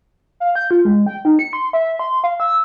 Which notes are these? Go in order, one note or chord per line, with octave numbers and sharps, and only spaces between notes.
F5
G6
F4
G#3
G5
D#4
C#7
C6
E5
C6
F5
E6